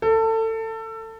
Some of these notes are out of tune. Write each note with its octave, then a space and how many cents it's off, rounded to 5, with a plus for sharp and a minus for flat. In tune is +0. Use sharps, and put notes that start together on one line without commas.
A4 +25